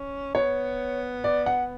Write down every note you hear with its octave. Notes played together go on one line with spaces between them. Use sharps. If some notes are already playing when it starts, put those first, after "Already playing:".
Already playing: C#4
B3 C#5
D5
F#5